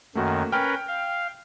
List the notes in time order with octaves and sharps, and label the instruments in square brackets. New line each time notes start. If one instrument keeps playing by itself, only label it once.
[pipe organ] F#2 D#3 [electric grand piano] A3 A#3 F#4
[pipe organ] C#4 A#4 B4 [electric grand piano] G5 F6
[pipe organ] F5